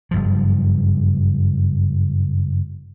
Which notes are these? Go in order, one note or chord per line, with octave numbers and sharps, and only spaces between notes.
F#1 G2 F3